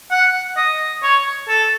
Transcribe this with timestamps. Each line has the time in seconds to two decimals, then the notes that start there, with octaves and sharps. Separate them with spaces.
0.11 F#5
0.57 D#5
1.03 C#5
1.49 A4